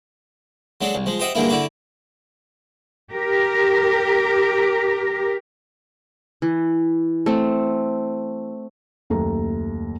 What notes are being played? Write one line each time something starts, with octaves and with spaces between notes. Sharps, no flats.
F#3 G#3 D4 A4
C2
F3 G#3
G4 C5 D#5 E5 F#5
G2 D3 G#3 A#3 E4
D3 E4 F#4 D6
G4 A#4
E3
A3 C4
F#1 D#2 A3 A4 A#5